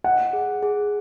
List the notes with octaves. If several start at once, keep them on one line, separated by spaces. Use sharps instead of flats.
D#5 F#5
G#4
G#4